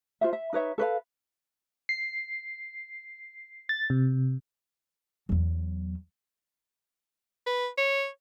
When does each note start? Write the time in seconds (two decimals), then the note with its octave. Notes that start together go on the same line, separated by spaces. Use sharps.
0.21 F4 C5 E5
0.33 E5
0.53 D#4 B4 C#5 E5
0.78 A4 B4 C5 F5
1.89 C7
3.69 A6
3.90 C3
5.29 E2 F#3
7.46 B4
7.78 C#5